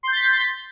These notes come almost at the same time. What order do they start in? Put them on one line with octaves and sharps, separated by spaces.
C6 G6 A6 B6